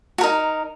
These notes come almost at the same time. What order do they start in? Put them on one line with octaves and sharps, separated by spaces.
F#4 A#4 D#4